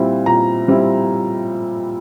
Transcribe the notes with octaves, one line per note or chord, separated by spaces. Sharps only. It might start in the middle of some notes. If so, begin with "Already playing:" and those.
Already playing: A#2 G3 C4 E4
A#2 A#5
G3 C4 E4